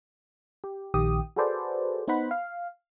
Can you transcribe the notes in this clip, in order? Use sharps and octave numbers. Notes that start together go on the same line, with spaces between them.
G4
A#1 D#3 G4 D#6
F#4 G#4 A4 B4 C5 D5
B3 D#4 C5 F#5 B5
F5